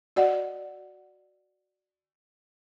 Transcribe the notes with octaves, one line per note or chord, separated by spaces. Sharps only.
F#4 D5 D#5 F#5